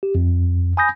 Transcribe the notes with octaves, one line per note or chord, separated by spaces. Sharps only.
G4
F2
G#5 B5 D#6 G6 A#6